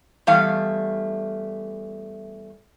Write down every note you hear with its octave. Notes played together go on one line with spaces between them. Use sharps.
E2 G3 A3 F5